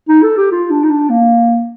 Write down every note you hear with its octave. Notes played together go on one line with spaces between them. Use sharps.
D#4
A4
G4
F4
D4
D#4
D4
A#3